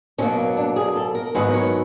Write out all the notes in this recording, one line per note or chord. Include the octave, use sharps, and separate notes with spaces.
B2 F#3 A#3 C#4
D4
G#4
A4
A#4
G#2 D#3 F#3 B3 B4
C#5